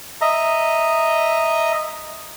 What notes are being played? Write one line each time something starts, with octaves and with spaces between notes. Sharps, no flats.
D#5 E5 A#5